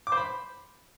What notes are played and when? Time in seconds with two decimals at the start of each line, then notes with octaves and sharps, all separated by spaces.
0.07 D6
0.12 C5
0.17 B5